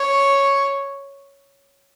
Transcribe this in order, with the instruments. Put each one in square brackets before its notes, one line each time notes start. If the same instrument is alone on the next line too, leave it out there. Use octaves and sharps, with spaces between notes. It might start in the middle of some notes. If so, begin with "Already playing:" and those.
Already playing: [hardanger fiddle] C#5